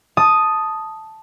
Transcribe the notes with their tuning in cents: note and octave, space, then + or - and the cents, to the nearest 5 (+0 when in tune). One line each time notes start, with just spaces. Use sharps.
A5 +0 D#6 +0